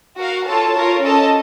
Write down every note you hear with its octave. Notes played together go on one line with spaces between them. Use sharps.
F#4 A#4 F5
F4 A4 C#5 A5
F4 A#4 C#5
C#4 A4 D#5 A5